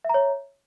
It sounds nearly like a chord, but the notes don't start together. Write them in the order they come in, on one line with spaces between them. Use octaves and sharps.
E5 A#5 C#5